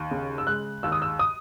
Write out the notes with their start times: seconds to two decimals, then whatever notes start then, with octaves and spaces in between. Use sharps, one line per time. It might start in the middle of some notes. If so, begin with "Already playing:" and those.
Already playing: D#2
0.11 C#3
0.38 E6
0.47 G#3 F#6
0.83 D#2 E6
0.92 D#6
1.02 E6
1.19 D#6